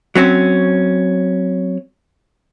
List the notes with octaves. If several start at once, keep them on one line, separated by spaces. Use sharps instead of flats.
F#3 C4 C#4